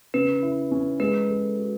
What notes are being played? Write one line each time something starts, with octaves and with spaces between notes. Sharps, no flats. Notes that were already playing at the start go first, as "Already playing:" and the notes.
C#3 B4
E4
C#4
G#3 B4
A4
F#4